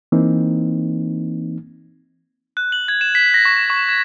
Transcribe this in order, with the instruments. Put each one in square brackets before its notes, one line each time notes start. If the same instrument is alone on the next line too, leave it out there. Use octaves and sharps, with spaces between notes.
[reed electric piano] E3 A#3 C4 D#4
[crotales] F#6
F#7
G#6
E7
B6
A#6
C#6
C#6
G#6